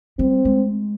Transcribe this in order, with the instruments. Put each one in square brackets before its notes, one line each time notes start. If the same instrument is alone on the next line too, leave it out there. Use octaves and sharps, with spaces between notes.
[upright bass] G3 [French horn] C4
[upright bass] G#3